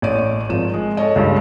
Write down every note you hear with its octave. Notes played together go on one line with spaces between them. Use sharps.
A1 C#5 D5 D#7
G#1 F3 E7
G#3
A4 C#5 D#5
C#2 G2 F4